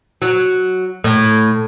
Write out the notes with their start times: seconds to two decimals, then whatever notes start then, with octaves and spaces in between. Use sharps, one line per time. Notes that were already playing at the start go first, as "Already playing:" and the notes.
0.22 F#3
1.04 A2